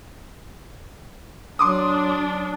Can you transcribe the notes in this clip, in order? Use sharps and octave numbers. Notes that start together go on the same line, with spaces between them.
F#3 D4 C6 D6 D#6